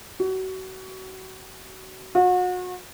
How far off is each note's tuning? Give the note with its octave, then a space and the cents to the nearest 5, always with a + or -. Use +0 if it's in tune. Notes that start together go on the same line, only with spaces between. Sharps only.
F#4 +30
F#4 -35